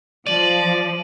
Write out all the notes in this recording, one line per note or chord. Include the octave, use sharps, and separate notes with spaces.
F3 D5 D#7 F#7